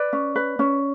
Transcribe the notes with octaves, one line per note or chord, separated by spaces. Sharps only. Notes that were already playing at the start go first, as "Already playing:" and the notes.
Already playing: B4 D5
C#4
B4
C#4